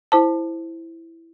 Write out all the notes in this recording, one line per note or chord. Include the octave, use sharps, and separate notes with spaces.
E4 C5 A5